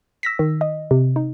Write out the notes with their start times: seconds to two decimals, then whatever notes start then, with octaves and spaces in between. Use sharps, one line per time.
0.23 E6 A#6 B6
0.39 D#3
0.61 D#5
0.91 C3
1.16 D#4